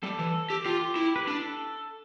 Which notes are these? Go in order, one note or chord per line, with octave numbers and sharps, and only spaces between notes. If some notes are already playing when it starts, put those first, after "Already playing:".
G3 A4
E3
G4
F4 G4
E4
B4
D4 A4